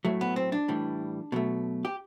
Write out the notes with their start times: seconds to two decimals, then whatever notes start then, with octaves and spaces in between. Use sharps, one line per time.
0.05 A2 F#3 A3
0.21 B3
0.36 C4
0.52 D4
0.68 A2 E3 G3
1.32 B2 F#3 A3
1.85 G4